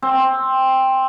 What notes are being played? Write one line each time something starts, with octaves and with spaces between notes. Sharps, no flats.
C4